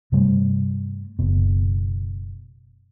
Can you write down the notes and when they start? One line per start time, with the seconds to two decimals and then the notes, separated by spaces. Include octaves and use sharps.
0.12 G2 C3 G3 A3
1.19 F#1 B2